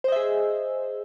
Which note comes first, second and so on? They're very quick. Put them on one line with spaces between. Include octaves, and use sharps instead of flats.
C5 D#5 E5 G#4